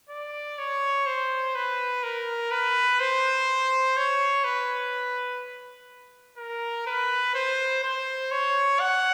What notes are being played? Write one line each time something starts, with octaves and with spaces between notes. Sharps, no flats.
D5
C#5
C5
B4
A#4
B4
C5
C#5
B4
A#4
B4
C5
C5
C#5
F#5